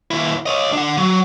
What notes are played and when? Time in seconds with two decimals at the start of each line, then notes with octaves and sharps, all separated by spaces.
0.11 D#2 E4
0.46 C#5 D#5
0.73 D4 F#5
0.98 F#3